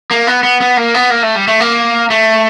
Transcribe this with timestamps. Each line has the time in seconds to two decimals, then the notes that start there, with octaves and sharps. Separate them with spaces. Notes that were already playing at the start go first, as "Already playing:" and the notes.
0.11 A#3
0.27 B3
0.43 B3
0.60 B3
0.77 A#3
0.94 B3
1.10 A#3
1.22 A3
1.35 G3
1.48 A3
1.60 A#3
2.10 A3